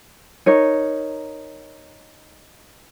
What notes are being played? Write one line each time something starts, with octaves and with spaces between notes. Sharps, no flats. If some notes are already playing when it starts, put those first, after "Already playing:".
D#4 A#4 C#5